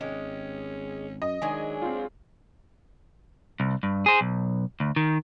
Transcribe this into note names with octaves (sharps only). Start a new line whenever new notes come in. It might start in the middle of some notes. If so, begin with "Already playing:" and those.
G#1 G#3 C#4 G4
F#2 D#5
D#3 F#3 G#3 D4 G#5
C4 F4
C2
G2
G#4 C5
B1
D2
D#3